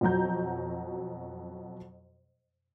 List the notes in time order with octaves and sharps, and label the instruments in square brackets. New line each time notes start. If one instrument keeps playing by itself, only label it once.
[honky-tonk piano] F2 B2 F#3 A#5 G6